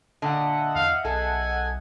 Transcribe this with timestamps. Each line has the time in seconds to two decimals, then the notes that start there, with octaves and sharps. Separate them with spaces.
0.22 A#2 D3 D#5 E5 F#5
0.75 E2 F5
1.05 B1 G#4 A4 G#5